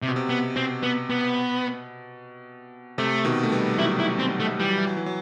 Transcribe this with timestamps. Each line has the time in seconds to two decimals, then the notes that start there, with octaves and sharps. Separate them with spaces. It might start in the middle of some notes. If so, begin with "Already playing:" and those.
0.02 C3
0.08 B2
0.16 C3
0.29 B3
0.56 B2 C4
0.83 B3
1.10 B3
2.98 C3 A3
3.25 B2 D#3
3.43 A3
3.52 G3 B3
3.79 D#3 F#3 E4
4.00 E4
4.19 C4
4.40 A3
4.60 E3 G3
4.69 F#3
4.78 E3
4.87 F#3
4.97 E3
5.06 F#3